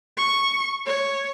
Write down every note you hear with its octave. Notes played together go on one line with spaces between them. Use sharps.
C#6
C#5